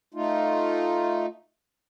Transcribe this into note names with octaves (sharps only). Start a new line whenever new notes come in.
A3 D#4 F4